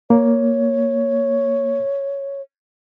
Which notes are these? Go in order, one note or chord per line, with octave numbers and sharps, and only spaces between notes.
A#3 C#5